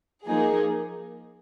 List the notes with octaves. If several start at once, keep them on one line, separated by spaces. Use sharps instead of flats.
F3 A#3 D#4 G#4